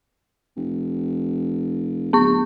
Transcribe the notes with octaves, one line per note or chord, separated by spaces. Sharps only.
F1
D1 B3 C#6